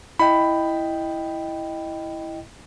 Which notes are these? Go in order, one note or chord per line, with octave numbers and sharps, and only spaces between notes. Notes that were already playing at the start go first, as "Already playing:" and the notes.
E4 D#5 G5 B5